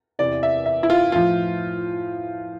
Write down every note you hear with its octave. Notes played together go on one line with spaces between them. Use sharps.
E2 C3 E3 D5
E5
E5
E4
F4
A2 F3 F4